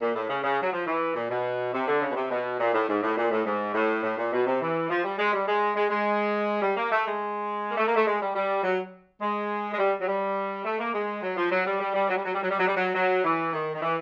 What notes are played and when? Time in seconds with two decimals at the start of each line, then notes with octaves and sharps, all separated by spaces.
0.01 A#2
0.15 A2
0.29 C#3
0.43 C#3
0.62 F#3
0.73 F3
0.87 E3
1.15 A#2
1.30 B2
1.73 C3
1.88 D3
2.02 C#3
2.10 B2
2.16 C3
2.31 B2
2.59 A#2
2.74 A2
2.88 G#2
3.03 A2
3.17 A#2
3.31 A2
3.46 G#2
3.74 A2
4.03 A2
4.17 A#2
4.32 B2
4.46 C3
4.61 E3
4.90 F3
5.04 G3
5.18 G#3
5.33 G3
5.47 G#3
5.76 G#3
5.90 G#3
6.62 G3
6.77 A#3
6.91 A3
7.06 G#3
7.71 A#3
7.77 A3
7.87 A#3
7.96 A3
8.06 G#3
8.20 G3
8.35 G3
8.63 F#3
9.21 G#3
9.73 G#3
9.78 G3
10.01 F#3
10.07 G3
10.65 A3
10.79 A#3
10.93 G#3
11.22 F#3
11.37 F3
11.51 F#3
11.65 G3
11.80 G3
11.94 G3
12.09 F#3
12.17 G3
12.25 F#3
12.34 G3
12.42 F#3
12.50 G3
12.59 F#3
12.67 G3
12.75 F#3
12.95 F#3
13.24 E3
13.53 D#3
13.75 D#3
13.82 E3